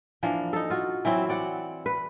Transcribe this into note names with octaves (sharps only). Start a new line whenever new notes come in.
E3 F3 A#3 D4
D#4 A4
F4 F#4
E3 F#3 C4 E4
C4 D5 F#5
B4